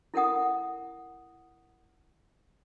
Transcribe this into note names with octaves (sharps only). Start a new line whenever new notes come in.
E4 A4 A#4 F#5 D#6